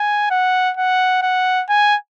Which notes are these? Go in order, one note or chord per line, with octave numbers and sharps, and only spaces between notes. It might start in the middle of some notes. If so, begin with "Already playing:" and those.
Already playing: G#5
F#5
F#5
F#5
G#5